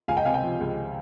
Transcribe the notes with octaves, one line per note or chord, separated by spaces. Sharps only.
C#2 F5 G#5
D#5 G5
C3 F5 G#5
D#5 G5
F3
C#2